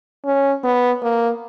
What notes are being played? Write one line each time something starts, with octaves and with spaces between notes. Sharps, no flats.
C#4
B3
A#3